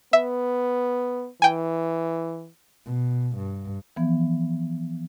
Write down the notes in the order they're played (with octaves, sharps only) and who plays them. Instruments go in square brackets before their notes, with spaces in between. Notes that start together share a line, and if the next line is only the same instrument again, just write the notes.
[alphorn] B3 [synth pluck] E5
[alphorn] E3 [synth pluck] G5 G#5
[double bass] B2
G2
[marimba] E3 F3 B3